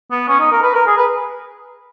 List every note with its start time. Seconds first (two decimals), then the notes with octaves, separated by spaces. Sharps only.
0.11 B3
0.28 C#4
0.40 D#4
0.52 A#4
0.63 B4
0.75 A#4
0.86 G#4
0.97 B4